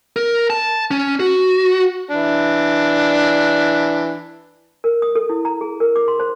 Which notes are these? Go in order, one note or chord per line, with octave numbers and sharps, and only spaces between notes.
A#4
A5
C#4
F#4
E3 D4
A#4
D#6
A4
E4
A#5
G#4
A#4
D6
C6
C5